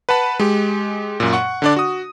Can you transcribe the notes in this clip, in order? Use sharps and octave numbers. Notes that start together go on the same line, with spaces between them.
B4 F#5 A5 B5
G#3 G4
F#2 A#2
F#5 C#6
D3 D4 D5
F#4 D#6